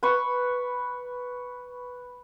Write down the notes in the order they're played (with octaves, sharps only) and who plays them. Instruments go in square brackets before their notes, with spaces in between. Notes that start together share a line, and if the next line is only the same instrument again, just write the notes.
[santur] B4 B5 C#6